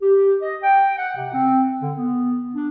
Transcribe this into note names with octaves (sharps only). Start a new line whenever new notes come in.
G4
D#5
G5
F#5
C3
C4
D3
B3
D4